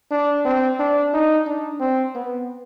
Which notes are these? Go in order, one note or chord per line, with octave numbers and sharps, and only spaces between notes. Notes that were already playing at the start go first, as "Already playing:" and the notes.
D4
C4
D4
D#4
D4
C4
B3